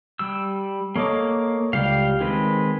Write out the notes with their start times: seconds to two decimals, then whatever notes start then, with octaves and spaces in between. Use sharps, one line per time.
0.19 G3 E6
0.96 A#3 A4 C#5 D#5 D6
1.73 C#2 G3 G4 F5 C7
2.20 D#3 G#3 C4 B4